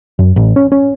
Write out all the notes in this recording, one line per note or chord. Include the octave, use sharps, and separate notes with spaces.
F#2
A1
C#4
C#4